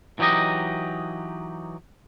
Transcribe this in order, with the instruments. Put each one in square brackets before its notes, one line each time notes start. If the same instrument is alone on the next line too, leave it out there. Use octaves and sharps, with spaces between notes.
[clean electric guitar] E3 F#3 D#4 G4 D#5